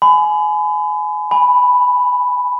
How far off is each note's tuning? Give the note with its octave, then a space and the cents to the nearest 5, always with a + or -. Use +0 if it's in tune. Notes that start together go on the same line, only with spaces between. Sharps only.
G#5 +25 B5 +30
G#5 +0 B5 +0